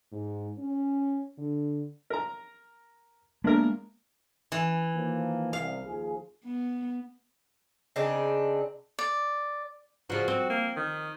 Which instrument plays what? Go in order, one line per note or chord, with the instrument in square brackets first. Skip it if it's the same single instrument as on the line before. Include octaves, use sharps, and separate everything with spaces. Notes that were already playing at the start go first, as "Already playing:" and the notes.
[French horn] G#2
C#4
D3
[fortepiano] A#4 A#5
[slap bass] G#3 B3 [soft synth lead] A#3 [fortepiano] D4 A#4
[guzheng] E3
[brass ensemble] D#3 F3 A#3
[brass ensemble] C2 [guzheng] F5
[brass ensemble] D#2 F3 G#4
[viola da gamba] B3
[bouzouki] C#3 C4 D4 D#4
[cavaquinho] D5
[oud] C#3 F3 [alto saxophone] F#4
[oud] C4
[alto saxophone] A#3
D#3